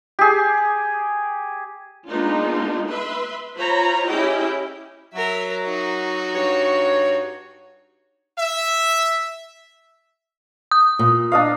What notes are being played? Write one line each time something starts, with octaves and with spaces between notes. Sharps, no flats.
G4 G#4
G#3 A#3 B3 D4 D#4 F4
B4 E5 C6
F4 C5 C#5 A#5 B5
C#4 E4 G4 G#4 D#5 G5
F#3 A#4 E5
D#4 F#4
G2 C#5
E5
D#6
A#2
D4 D#5 F5